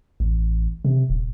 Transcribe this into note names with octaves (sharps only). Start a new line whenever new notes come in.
A1
C3
D#1